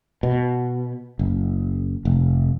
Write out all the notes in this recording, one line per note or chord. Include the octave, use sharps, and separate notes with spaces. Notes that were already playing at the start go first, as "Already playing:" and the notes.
B2
F#1
F1